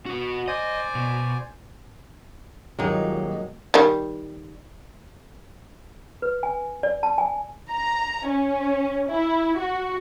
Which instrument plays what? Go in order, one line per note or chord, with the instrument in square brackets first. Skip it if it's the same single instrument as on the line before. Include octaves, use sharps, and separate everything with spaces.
[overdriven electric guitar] B3 F#4
[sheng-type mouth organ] C5 D5 G#5 [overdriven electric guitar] D#5
[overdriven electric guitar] B2
[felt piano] D#1 [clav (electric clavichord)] A#2 F#3 A#3 [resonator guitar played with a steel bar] G#3 D#4
[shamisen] D#3 G3
[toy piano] B4
G#5
D5
A5
G#5
[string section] A#5
C#4
E4
F#4